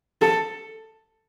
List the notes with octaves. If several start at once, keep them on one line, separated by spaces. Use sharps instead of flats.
A4